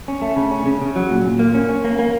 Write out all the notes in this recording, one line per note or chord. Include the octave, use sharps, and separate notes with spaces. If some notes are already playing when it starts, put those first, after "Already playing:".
C#4
A3
C#3
C#4
C#3
C#3
F#3
A#2
A#2
A#3
C#4
C#4
A#3
A#3